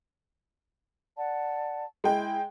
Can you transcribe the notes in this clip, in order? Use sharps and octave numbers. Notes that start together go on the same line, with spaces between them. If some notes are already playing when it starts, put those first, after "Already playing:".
D5 F#5 A5
G#3 E4 G5